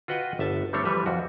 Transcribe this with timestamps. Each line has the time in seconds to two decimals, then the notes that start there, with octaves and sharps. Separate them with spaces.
0.08 F4 F#4 B4 D#5 F#5 G5
0.39 G1 E5 A5
0.73 G3 A3 C4 D4 A4 C#5
0.85 E3 F3 G3 B4 E5
1.06 F2 F#4